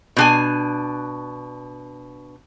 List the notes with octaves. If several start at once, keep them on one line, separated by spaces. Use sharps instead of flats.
B2 D4 G#5